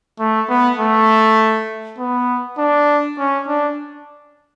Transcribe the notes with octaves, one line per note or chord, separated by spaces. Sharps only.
A3
B3
A3
B3
D4
C#4
D4